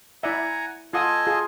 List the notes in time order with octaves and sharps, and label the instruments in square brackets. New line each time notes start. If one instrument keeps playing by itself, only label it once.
[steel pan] E4 D5 E5 [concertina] F#5 G#5 A#5
[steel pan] F4 F#5 D#6 [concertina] A4 D#5 G#5
[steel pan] F4 G#4